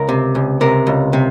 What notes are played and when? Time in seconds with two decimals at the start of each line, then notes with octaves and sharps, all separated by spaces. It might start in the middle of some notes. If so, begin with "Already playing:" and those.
Already playing: C#2 A#4
0.09 C3
0.35 C#2
0.61 C3 A#4
0.87 C#2
1.13 C3